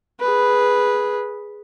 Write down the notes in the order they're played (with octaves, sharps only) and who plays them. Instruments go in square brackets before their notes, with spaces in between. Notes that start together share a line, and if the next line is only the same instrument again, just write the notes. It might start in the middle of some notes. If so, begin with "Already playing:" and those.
[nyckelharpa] G#4 B4